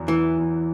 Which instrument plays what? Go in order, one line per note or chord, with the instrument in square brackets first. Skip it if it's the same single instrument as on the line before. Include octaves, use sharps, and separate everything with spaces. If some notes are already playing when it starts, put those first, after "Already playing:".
Already playing: [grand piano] E2 F#3
[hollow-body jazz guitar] E3
[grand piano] E2